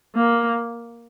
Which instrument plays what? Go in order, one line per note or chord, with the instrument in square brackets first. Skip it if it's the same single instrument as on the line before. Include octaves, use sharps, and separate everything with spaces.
[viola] A#3